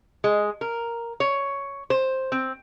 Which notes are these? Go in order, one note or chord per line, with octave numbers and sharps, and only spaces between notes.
G#3
A#4
C#5
C5
C4